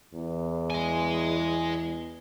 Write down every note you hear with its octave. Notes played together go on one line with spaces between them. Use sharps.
E2
D#5 G#5